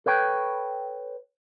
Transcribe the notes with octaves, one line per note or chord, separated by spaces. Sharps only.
A4 B4 C#5 G5